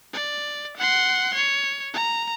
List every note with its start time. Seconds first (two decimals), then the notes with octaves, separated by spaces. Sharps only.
0.14 D5
0.77 F#5 C6
1.35 C#5
1.93 A#5